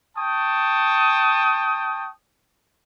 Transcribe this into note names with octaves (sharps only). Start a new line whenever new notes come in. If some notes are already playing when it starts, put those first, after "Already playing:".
G5 A5 C#6 D#6